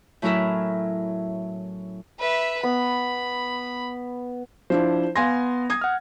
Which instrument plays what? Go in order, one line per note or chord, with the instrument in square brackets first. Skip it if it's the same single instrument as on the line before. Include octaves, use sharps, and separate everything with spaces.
[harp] A2 F#3 C#4 E4 A#4 E5
[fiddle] B4 E5
[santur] B3 [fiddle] B5
[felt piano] F3 D4 E4 [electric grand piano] C5
[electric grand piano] B3 G#6 A#6 [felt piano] F5 G#5 C6
[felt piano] D#6 G#6
[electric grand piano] F#5 F6